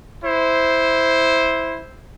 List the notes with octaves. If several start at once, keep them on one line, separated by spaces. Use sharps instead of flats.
E4 C5